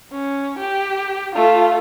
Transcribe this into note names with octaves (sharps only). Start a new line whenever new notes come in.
C#4
G4
A3 F4